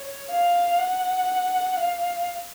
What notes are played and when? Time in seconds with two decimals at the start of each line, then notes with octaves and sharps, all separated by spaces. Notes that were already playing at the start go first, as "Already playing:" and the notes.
Already playing: C#5
0.30 F5
0.79 F#5
1.76 F5